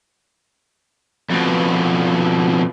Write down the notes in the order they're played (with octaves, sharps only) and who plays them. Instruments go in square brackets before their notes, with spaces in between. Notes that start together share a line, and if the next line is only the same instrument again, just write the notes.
[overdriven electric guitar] F2 B2